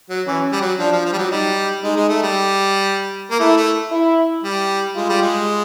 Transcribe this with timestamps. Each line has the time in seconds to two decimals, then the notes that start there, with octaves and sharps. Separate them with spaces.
0.09 F#3
0.27 E3 C#4
0.52 G3
0.61 F#3
0.79 F3 D4
0.92 F3
1.05 F3
1.13 G3
1.18 F#3
1.31 G3 D#4
1.83 G#3 D#4
1.96 G#3
2.09 A3
2.22 G3
3.31 A#3
3.40 A3 E4
3.57 A3
3.92 E4
4.44 G3
4.96 G#3 F4
5.09 G3
5.22 G#3